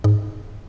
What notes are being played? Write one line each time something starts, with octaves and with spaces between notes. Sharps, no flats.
G#2